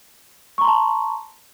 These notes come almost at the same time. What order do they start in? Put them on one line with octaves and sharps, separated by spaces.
C#6 A#5 C6 A5